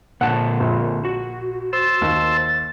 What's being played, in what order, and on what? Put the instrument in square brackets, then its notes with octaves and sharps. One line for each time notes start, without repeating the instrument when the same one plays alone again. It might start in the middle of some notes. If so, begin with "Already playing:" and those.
[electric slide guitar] A#2 D3 A5 [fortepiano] F#5
[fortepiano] A#1
[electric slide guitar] F#4
[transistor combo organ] C5 E6 [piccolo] A6
[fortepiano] D#2